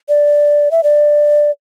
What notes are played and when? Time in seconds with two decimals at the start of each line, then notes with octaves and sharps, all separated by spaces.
0.09 D5
0.71 E5
0.83 D5